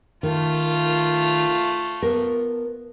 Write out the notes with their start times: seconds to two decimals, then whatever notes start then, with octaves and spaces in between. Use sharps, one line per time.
0.23 D#3 A3 F4
2.03 B3 A#4